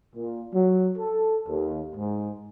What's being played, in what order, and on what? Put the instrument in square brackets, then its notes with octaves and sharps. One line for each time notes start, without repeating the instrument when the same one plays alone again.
[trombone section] A#2
F#3
A4
D#2
G#2